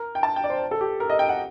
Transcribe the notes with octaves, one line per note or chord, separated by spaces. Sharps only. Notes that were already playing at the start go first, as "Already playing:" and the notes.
Already playing: A#4
G5
A5
G5
D5
C5
A4
G4
A#4
D#5
G5
F#5